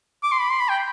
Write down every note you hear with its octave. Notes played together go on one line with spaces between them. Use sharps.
D6
C6
B5
C6
B5
G5